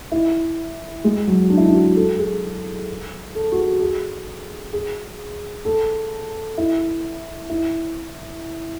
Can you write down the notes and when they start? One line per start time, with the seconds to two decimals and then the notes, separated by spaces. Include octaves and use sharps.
0.12 E4
1.04 G#3
1.27 F#3
1.50 D4
1.57 E4
1.66 D4
1.74 F#4
1.96 A4
2.19 G#4
3.35 A4
3.52 F#4
3.58 G#4
3.81 G#4
4.73 G#4
5.65 A4
6.58 E4
7.49 E4